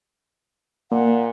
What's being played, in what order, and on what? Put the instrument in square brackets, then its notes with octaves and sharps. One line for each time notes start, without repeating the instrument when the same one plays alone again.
[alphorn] A#2 [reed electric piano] A#3 [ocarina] F#5